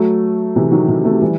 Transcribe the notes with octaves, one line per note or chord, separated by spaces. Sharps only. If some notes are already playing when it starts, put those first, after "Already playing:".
Already playing: F#3 A3
C3 E3
D#3 F#3
D#3 F#3
F#3 A3
E3 G3